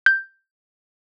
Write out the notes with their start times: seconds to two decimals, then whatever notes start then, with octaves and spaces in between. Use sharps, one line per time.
0.06 G6